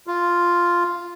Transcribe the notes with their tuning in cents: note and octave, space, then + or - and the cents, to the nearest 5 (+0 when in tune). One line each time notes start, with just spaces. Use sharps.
F4 -5